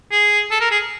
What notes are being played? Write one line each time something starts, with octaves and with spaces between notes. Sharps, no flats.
G#4
A4
A#4
G#4